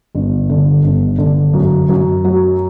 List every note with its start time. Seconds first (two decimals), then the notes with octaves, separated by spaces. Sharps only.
0.15 G1
0.49 D3
0.84 G1
1.18 D3
1.53 F#2
1.89 F#2
2.24 F#3